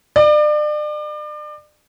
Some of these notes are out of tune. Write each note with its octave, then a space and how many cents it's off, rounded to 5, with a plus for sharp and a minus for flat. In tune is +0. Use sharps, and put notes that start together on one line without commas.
D5 +35